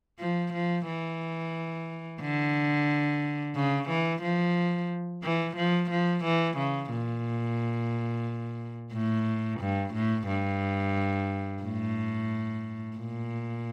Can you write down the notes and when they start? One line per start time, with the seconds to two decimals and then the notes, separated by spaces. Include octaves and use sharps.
0.19 F3
0.53 F3
0.86 E3
2.21 D3
3.56 C#3
3.89 E3
4.22 F3
5.23 E3
5.56 F3
5.90 F3
6.24 E3
6.58 C#3
6.91 A#2
8.93 A2
9.60 G2
9.94 A2
10.28 G2
11.62 A2
12.97 A#2